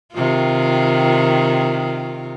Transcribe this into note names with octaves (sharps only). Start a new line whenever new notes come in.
C3 D#3 F4